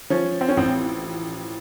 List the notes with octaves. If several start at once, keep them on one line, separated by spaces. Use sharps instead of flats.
F3 C#4
C4
C#4
A1 C4